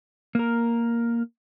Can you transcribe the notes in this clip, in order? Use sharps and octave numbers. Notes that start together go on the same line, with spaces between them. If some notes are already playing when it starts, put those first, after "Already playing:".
A#3 A#4